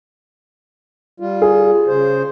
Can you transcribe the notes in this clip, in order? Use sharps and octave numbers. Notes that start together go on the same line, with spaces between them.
G3 F4
G#4
C#3 C5